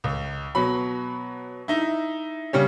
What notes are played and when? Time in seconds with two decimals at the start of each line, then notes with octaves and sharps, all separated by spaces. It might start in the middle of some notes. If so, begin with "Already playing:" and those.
0.04 C#2
0.55 B2 F#3 B5
1.68 D#4 E4
2.53 C#3 G3 C#4